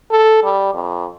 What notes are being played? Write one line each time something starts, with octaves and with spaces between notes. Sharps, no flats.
A4
G3
F2